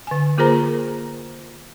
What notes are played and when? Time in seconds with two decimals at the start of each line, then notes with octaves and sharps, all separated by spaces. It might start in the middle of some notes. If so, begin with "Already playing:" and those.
0.07 D3 G#5
0.38 A#3 F4 G#4 A#4 C5 A#5